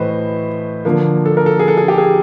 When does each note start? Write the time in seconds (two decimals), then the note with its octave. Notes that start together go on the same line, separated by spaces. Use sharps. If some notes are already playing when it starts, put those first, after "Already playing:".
Already playing: A2 E3 A3 B4 C5 D#5
0.85 D3 F3 A#3
1.26 A4
1.37 A#4
1.46 A4
1.59 G#4
1.68 A4
1.77 G#4
1.88 G4
1.98 G#4